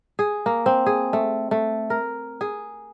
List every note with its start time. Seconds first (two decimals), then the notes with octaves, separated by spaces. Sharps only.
0.19 G#4
0.46 A#3
0.66 C4
0.86 G#4
1.13 A3
1.51 A3
1.90 A#4
2.41 G#4